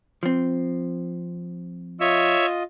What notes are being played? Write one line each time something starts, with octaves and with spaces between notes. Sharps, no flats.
F3 C4
F4 C#5 D#5 E5